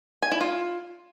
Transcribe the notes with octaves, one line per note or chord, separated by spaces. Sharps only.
G#5
E4
F4